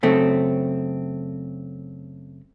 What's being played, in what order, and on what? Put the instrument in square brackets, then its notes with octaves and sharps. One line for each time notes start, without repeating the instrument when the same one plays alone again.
[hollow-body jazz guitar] F#2 C#3 A3 C4